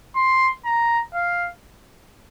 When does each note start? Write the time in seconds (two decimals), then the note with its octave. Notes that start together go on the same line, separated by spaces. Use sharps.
0.16 C6
0.65 A#5
1.14 F5